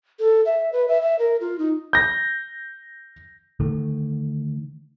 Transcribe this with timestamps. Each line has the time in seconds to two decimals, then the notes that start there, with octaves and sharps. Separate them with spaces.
0.20 A4
0.45 E5
0.73 B4
0.88 E5
1.02 E5
1.19 A#4
1.41 F4
1.59 D#4
1.93 G6 A#6
3.60 D3 D#3 A3